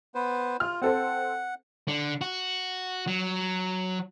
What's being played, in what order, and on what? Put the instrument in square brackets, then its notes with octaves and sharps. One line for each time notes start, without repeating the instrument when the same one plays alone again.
[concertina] B3 B4 C5
[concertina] F4 [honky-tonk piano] F6
[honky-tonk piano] C4 A4 C5 [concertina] F#5
[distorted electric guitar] D3
F#4
F#3